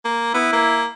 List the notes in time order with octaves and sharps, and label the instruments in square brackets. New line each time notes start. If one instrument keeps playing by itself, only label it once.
[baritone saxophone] A#3
[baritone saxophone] B3 [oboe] E4
[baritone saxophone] A#3